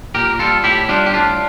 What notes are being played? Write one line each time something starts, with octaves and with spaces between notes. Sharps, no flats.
A#2 G4 A#4
G3 F4 A4
A2 E4 G4
G3 D4 F4
G4
A2 D4 F4